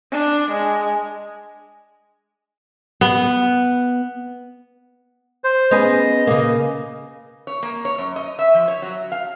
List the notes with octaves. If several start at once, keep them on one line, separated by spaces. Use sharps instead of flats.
D4
G#3
B3
C5
B3 C#4 G#4 D#5
C#3 A#3
C#5
A#3
C#5
F#2
D#5
E5
F3
C#5
F#3
F5